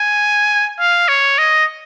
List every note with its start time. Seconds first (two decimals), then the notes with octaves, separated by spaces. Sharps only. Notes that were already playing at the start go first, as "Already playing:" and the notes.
Already playing: G#5
0.79 F5
1.08 C#5
1.38 D#5